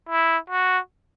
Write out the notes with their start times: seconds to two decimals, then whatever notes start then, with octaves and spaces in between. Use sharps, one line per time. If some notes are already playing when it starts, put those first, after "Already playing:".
0.09 E4
0.50 F#4